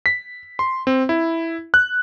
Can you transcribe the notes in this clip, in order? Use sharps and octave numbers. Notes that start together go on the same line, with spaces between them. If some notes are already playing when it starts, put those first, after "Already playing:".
B6
C6
C4
E4
F#6